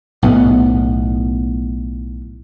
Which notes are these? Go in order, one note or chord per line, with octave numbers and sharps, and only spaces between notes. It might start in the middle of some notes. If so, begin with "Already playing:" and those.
B1 A2 B3